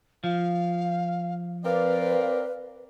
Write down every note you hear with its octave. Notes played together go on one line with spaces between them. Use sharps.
F3 F5
C4 A#4 B4 D5 F5